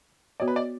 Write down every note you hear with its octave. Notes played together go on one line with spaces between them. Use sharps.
B3 F#4 C#5 D5
B4
D5